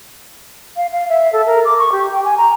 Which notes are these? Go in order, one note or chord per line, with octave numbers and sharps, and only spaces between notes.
F5
F5
E5
A4
A#4
D6
C#6
G4
G5
G#5
A#5